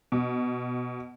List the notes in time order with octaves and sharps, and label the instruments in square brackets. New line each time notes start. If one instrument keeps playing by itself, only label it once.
[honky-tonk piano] B2